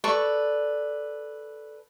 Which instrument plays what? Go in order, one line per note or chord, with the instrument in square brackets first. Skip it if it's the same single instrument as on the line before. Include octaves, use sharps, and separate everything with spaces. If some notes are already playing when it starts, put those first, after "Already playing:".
[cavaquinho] A4 B4 D5 C#6